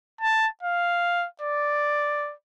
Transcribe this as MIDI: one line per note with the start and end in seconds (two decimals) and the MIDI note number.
0.21 0.48 81
0.63 1.26 77
1.41 2.34 74